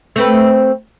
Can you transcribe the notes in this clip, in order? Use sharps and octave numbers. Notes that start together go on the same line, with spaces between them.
A3 C4 B4